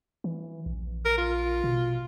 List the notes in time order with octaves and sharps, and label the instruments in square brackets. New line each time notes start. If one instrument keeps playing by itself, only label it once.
[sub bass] E3
A#1
[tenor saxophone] A#4
F4
[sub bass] B2